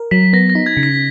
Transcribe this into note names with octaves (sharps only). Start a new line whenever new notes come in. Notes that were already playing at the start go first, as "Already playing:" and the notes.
Already playing: A#4
F#3 B6
B3 A#6
A#6
D#4
G#6
C#3
B6